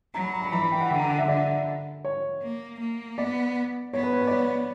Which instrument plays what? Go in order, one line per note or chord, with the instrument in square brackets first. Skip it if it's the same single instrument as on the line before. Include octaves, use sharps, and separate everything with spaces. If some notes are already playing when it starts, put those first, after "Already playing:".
[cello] F#3 [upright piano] A#5
[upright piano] B5
A#5
B5
[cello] E3 [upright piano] A#5
[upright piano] B5
G5
F#5
[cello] D3 [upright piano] G5
[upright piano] A#5
F#5
E5
[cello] D3 [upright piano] D5
[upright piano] C#5
[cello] A#3
A#3
[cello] B3 [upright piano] D5
[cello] B3 [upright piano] C#5
[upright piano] B4
C#5
B4
D5
C#5